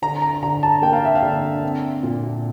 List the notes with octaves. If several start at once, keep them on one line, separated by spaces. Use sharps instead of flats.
D3 A#5
A#5
D3 A#5
A5
A#3 G5
F5
E5
F5
D3
C4
A#2